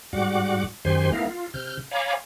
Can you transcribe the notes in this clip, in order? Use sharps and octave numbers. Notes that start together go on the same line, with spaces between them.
G#2 G3 F#4 F#5 D6
F#2 D#3 G4 C5 G#5 C6
A3 B3 D#4 E4 A#4 F5
F4
C3 F6 G6
C#5 F5 G#5 A#5 B5 D6